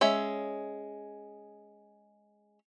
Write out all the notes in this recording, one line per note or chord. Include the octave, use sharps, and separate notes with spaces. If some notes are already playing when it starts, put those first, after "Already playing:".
G#3 C#4 E5